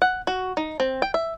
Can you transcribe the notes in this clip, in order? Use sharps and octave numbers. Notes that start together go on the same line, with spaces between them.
F#5
F#4
D#4
C4
G5
E5